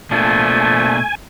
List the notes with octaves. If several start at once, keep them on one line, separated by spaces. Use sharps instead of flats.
B2 F3 A3 A#3 D4 G#5